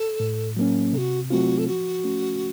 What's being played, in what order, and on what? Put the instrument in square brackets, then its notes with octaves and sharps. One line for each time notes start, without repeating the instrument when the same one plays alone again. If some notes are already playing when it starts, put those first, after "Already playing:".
Already playing: [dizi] A4
[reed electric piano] A2
F#3 A#3 C#4
[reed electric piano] C3 [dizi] A4
[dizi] F#4
[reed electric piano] F#3 A3 C4 F4 [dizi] F#4
[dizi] A4
[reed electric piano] F3 [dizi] F#4
[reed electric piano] A3 C#4